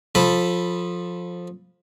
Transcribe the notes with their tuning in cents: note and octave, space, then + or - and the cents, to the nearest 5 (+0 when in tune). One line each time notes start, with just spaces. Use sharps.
F3 +15 A4 +0 B5 +0